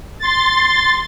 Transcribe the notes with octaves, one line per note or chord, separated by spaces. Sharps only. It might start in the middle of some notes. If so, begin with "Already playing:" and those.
C6 A6